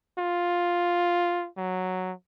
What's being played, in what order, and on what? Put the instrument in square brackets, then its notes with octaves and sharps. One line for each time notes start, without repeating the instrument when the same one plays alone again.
[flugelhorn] F4
F#3